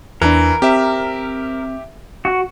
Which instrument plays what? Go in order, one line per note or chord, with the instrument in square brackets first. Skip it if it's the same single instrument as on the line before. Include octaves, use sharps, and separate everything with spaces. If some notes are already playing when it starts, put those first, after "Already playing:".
[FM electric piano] E2 D4 [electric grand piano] E3 [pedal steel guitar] A#4
[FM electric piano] C4 [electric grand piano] G4 E5
[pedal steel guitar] F#4